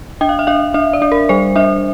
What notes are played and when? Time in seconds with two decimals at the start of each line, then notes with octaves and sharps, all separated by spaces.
0.21 D4 G5
0.29 F5
0.39 E5
0.47 D4 F5
0.74 D4 E5
0.93 D5
1.02 D4
1.12 A#4
1.29 G3 C5
1.56 D4 E5